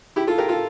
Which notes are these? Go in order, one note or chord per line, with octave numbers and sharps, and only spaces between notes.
E4 G4
F4 A4
G4 A#4
F4 A4